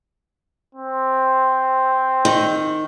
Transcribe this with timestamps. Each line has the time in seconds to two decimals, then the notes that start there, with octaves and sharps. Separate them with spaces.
0.75 C4
2.25 D#3